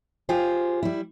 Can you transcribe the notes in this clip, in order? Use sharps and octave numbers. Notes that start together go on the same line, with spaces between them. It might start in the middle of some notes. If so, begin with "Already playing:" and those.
F4 G4 G#4 C5
G3 E4